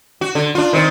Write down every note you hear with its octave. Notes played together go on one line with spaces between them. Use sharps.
F#4
D3
D4 F4
D#3 C4